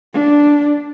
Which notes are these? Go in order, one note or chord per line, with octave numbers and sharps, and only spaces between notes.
D4